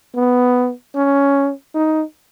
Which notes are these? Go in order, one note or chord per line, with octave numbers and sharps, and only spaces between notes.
B3
C#4
D#4